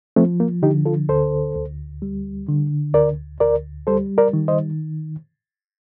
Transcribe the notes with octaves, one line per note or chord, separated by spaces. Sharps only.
F3 A3 C4
A#3
D3 D#4 G4
F4 A4
D2 A4 C5
D2
G3
D3
D2 A#4 D5
D2 A#4 D5
G3 A4 C5
A#4 D5
D#3
C5 D#5